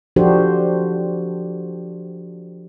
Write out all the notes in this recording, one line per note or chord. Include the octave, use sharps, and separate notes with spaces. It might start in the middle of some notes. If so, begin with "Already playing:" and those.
F3 D4 F#4 G4 A4 C5